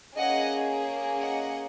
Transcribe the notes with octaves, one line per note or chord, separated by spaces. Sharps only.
A#3 C#4 G#4 D#5 F#5
D#5 F#5